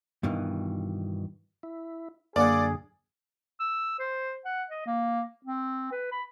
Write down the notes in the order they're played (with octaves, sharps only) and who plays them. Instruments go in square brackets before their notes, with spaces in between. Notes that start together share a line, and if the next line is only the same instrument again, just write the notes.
[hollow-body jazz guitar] G2 B2 D#3 E3
[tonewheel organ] E4
[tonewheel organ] F#2 D3 [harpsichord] A#3 F#5 [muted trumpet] G#4 [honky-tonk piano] D5
[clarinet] E6
C5
F#5
D#5
A#3
C4
B4
B5